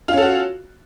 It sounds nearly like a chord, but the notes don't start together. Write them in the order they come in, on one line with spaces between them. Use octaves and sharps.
F4 C#4 A4 F#4